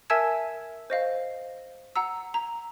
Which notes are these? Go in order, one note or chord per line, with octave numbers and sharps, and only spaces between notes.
A#4 E5 G#5 A5 E6 G#6
C5 D#5 F5
F#5 A#5 E6
A#5